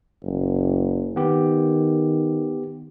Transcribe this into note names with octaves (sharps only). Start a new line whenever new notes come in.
F#1
D#3 B3 G4